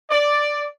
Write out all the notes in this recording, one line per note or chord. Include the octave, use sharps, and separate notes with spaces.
D5